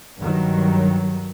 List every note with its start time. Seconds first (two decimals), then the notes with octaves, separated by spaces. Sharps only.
0.19 G2 D#3 F#3